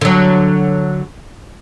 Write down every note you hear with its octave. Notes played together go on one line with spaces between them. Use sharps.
D3 F#3